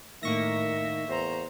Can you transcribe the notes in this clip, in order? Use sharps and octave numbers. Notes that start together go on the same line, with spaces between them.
A2 D#3 A#3 E5 C#6 A#6
E2 C5 A#5